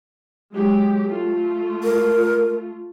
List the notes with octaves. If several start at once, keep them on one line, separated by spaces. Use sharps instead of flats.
F#3 G#3 G4
A3 F4
A#4